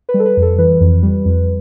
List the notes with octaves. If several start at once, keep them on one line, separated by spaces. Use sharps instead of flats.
B4
G3
A4
B4
F2
A4
E3 B4
F2
G3
F2